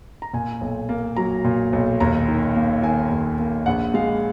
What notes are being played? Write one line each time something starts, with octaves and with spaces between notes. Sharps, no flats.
A#5
A#2 G#5
B1
A#3
F#3 A#5
A#2
B1
D#2 A#5
D#3
A#3
D#3 G#5
D#2
A#3
A#1 F#5
G#3 F5